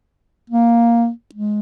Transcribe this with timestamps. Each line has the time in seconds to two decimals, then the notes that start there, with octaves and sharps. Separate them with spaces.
0.50 A#3
1.35 G#3